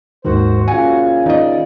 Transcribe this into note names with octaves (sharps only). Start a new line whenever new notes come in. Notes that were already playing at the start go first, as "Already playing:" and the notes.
D#2 G#2 D#3 F#4 C5
A#2 C#3 F#5 G#5
D#3 D#4 D5 D#5